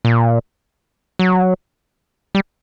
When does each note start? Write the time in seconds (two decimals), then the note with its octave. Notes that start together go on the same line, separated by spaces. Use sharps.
0.05 A#2
1.19 F#3
2.35 G3